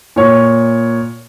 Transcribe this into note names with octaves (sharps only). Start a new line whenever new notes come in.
A#2 C#5